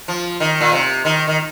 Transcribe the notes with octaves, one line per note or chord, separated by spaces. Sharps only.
F3
D#3
A#2
C3
D#3
D#3